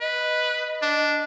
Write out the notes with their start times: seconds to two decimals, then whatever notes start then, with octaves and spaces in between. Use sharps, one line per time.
0.01 B4 D#5
0.82 D4